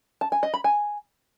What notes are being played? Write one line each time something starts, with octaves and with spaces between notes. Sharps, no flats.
A5
G#5
D#5
B5
G#5